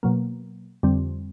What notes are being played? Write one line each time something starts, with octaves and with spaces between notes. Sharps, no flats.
B2 F#3 A#3
F2 D3 G3 C4